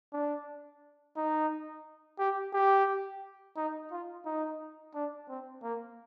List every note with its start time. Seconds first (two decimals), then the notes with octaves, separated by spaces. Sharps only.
0.13 D4
1.16 D#4
2.19 G4
2.53 G4
3.57 D#4
3.92 F4
4.25 D#4
4.95 D4
5.29 C4
5.63 A#3